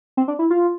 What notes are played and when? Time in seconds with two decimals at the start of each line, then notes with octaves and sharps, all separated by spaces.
0.17 C4
0.28 D4
0.39 E4
0.50 F4